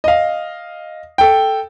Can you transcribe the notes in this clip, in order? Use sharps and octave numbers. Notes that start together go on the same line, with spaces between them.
D#5 F5
A4 G5